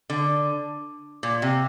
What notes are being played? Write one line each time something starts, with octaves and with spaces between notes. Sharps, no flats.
D3
A#2
C3